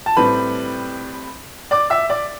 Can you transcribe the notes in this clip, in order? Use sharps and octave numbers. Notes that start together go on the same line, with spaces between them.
A5
A2 G3 C4 B4 B5
D5 D6
E5 E6
D5 D6